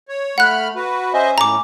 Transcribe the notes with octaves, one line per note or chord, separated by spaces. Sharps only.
C#5
A3 F#5 B5 F6 F#6
F#4 B4
C#4 C5 D#5 E5
A2 A#5 D6